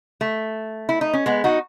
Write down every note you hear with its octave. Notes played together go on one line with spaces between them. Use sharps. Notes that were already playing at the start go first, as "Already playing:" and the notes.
A3
E4
D#4
C#4
G#3 B3
D#4 F#4